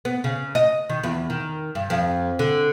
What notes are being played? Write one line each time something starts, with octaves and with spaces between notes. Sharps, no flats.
B3
C#3
D#5
D#3
E2
D#3
G2
F2
D3